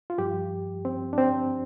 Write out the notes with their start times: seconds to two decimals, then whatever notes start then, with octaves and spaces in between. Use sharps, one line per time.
0.10 F4
0.18 G2 F3 G4
0.85 C4
1.13 D4
1.18 C4